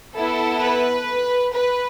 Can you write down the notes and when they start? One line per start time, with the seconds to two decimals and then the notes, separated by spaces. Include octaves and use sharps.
0.15 B3 E4 A4
0.62 B4
1.54 B4